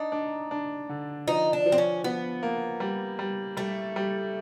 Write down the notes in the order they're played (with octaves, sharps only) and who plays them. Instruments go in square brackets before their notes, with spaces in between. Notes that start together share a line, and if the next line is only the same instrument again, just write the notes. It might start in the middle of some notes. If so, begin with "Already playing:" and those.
Already playing: [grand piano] D4 [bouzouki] D#4
[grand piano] D4
D4
D3
[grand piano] F3 [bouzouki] D#4
[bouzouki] D4
[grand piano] F3
[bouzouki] C4
C#4
[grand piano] F3 [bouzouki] B3
[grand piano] A#3
G3
G3
[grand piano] G3 [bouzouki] A3
[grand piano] G3